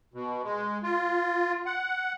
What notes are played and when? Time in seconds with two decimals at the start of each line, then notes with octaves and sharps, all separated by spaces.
0.14 B2
0.44 G#3
0.83 F4
1.66 F#5